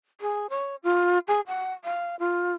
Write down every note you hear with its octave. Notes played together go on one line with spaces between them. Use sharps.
G#4
C#5
F4
G#4
F#5
F5
F4